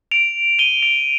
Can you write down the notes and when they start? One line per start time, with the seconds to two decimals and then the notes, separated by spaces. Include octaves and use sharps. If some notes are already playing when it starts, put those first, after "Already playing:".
0.11 D7 F7
0.59 D#7 G7
0.83 D7 F7